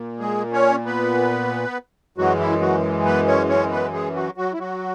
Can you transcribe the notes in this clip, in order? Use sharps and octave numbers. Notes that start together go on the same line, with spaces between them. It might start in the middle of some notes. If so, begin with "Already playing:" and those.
Already playing: A#2
G#3 G#4
C#4 C#5
B3 B4
F#2 E3 F#3 G#3 F#4
E4
F#3 F#4
B3 B4
C#4 C#5
C#4 C#5
B3 B4
G#3 G#4
F#3 F#4
F#3 F#4
E4
F#3 F#4